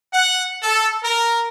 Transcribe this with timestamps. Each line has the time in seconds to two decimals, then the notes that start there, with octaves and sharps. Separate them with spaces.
0.13 F#5
0.63 A4
1.04 A#4